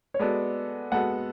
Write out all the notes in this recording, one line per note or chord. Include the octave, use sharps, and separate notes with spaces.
C#5
G#3 B3 F#4 A4 D5
G#3 B3 F#4 A4 F#5